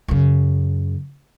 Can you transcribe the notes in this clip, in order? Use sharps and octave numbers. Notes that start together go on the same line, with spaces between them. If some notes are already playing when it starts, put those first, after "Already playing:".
F#2 C#3